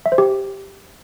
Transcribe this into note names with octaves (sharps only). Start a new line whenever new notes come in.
E5
C5
G4